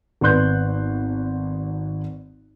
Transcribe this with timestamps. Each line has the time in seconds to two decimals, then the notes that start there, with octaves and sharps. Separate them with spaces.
0.21 G#1 B3 D5 C6 F#6 G6